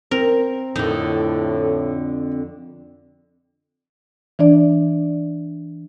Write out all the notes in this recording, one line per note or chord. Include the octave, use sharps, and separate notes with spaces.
C4 A#4
F2 A2 D3 D#4
E3 D4 D5